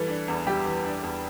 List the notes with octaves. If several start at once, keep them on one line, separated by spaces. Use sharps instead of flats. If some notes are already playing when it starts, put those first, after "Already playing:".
Already playing: E3 G3 A4
D4
E2
G3 G4
E3
D4
E2